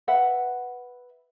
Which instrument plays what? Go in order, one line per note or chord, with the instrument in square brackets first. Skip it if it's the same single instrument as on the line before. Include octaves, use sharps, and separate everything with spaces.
[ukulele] B4 E5 F#5